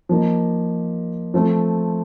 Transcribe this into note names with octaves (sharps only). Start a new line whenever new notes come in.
F3 A#3 D#4
F3 A3 C4